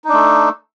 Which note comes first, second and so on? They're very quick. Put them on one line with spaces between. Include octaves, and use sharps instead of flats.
D#4 D4 A3